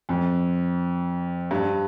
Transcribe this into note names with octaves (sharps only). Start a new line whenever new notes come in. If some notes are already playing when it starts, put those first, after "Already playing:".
F2
G2